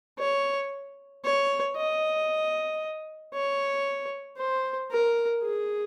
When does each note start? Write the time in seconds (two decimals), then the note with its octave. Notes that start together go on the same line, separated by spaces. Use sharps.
0.19 C#5
1.25 C#5
1.76 D#5
3.34 C#5
4.38 C5
4.91 A#4
5.43 G#4